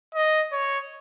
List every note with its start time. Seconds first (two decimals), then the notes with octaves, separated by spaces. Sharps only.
0.15 D#5
0.52 C#5